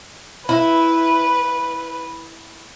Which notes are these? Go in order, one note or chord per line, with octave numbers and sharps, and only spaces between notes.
E4 B4